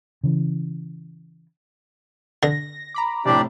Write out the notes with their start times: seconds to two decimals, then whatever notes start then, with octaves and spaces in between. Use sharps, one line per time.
0.24 C#3 E3
2.43 D3 A#6
2.94 A#5 B5 D6
3.26 F1 A2 D4 G4 D5